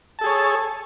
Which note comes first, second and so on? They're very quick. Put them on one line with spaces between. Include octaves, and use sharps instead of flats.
A5 A4 G#4 C#5